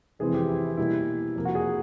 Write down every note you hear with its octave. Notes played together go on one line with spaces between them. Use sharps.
F2 C3 E3 G#3 C4 G#4
G4
E4
B2 G3 A#3 E4
F2 C3 F3 A#3
F#4
G#4